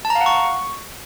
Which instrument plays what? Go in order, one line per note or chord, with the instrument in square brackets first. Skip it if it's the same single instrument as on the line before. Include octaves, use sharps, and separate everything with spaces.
[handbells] A5
A#5
F5
F#5
C#6